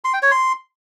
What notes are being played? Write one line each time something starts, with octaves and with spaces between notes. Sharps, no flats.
C6
G5
C#5
C6